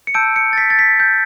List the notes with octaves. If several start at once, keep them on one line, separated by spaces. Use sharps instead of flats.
C#7
A5 E6 G6 D7
C#7
A6
B6
A6
B6
G6